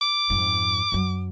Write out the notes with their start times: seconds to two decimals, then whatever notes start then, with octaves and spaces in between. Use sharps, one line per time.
0.02 D6
0.30 F2 G#2
0.92 F#2 F#3